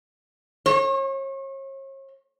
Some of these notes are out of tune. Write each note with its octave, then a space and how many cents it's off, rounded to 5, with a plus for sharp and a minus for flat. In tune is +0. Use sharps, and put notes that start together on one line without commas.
C#5 -40